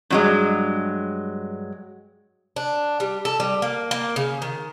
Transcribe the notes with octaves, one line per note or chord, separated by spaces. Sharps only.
G2 F#3 G#3
D4
G3
A4
G3
A#3
A#3
C#3
D#3